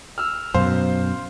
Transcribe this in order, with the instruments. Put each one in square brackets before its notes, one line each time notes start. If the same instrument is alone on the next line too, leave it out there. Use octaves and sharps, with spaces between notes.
[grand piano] E6 F6
[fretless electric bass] F#2 B2 [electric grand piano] C5 [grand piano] F5